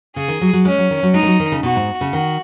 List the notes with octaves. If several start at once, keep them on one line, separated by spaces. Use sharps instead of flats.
C#3 G#4
D#3
F#3
F#3
G#3 C#4
F#3
D#3
F#3
G#3 D#4
D#3
F#3
D#3
C#3
B2 F#4
G#2
C#3
D#3 F#4